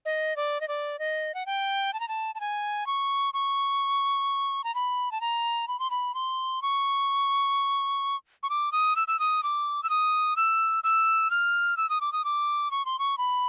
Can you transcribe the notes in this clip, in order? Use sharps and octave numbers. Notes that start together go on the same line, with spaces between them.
D#5
D5
D#5
D5
D#5
F#5
G5
A5
A#5
A5
A5
G#5
C#6
C#6
A#5
B5
A5
A#5
B5
C6
B5
C6
C#6
C#6
D6
D#6
E6
E6
D#6
D6
E6
D#6
E6
E6
F6
E6
D#6
D6
D#6
D6
C#6
C6
C#6
B5